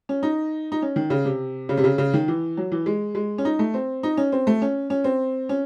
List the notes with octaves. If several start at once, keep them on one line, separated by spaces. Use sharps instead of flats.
C#4
D#4
D#4
C#4
D#3
C#3
C3
C#3
C3
C#3
C#3
D#3
E3
F#3
E3
G#3
G#3
C#4
D#4
A3
C4
D#4
C#4
C4
A3
C#4
C#4
C4
C#4